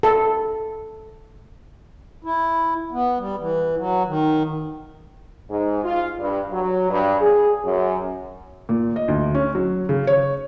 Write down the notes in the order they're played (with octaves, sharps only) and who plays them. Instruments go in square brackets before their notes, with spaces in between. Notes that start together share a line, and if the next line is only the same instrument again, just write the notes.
[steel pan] A4
[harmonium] E4
B3
G3
E3
F#3
D#3
[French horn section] G#2
F4
G2
F#3
G2
G#4
F#2
[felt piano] A#2
D#5
D2
C#4
F#3
C#3
C#5